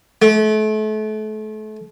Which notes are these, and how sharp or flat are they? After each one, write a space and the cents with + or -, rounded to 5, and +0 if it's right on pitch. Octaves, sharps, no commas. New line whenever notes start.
A3 -35